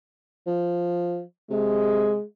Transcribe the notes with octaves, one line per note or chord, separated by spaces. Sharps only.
F3
C3 G#3